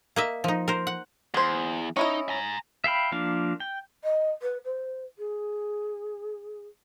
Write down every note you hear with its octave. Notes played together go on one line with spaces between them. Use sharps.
A#3 D#5 E5
F3 D#4
A#4 C5
F#5
E2 G#4 C5
C#4 D#4 E4 D#5
G#5 A#5
E5 F5 G5 B5
F3 A#3 D4 F5
G5
D#5
B4
C5
G#4